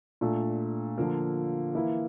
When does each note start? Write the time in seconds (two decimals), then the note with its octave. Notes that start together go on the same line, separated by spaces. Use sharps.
0.21 A#2 A3 D4
0.98 D3 F3 A#3
1.75 E3 A#3 E4